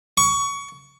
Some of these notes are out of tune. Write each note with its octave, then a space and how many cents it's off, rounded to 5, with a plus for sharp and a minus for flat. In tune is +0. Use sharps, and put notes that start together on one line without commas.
C#6 +20